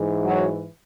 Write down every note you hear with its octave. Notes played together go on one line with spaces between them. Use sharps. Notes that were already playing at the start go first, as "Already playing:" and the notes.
Already playing: G#2 E3
F#3